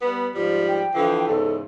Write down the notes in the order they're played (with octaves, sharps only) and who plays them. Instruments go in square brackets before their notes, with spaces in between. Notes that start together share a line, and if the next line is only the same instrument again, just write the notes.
[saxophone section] G3 B3
G#2 F3 G3
[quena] G5
[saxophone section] D3 E3 F3
[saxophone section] E2 G#2 C#3 [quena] A4